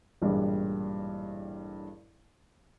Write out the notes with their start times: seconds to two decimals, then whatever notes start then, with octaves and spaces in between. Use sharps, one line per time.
0.21 A1 G2 A#2 G3 G#3